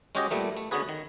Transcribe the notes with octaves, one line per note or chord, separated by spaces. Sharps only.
G#3 C#4 F#4 G4 C#5 D#5
A#2 G3 A3 B3
A3
D3 B3 C#4 F#4 G#4 B4
D#3